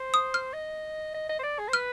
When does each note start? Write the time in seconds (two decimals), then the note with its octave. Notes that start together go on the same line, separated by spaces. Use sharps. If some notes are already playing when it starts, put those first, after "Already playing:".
Already playing: C5
0.14 D#6
0.34 F6
0.53 D#5
1.14 D#5
1.29 D#5
1.39 C5
1.43 D5
1.59 G#4
1.68 C5
1.73 B4 F6